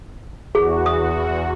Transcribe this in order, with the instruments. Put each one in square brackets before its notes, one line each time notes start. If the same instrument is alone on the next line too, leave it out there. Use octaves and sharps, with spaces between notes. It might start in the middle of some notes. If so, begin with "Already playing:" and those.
[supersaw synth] E2 F#4 [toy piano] G#4
[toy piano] D#6